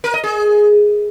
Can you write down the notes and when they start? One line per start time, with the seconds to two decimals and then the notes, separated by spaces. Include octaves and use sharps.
0.04 A#4
0.14 D#5
0.24 G#4